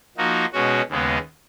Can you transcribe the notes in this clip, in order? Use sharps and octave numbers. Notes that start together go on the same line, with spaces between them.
F3 A#3 D#4 F#4
B2 G#3 C#4 F#4
D#2 C#3 G#3 B3 D#4